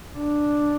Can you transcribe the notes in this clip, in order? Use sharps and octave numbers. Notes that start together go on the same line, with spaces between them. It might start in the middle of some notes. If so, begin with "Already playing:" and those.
D4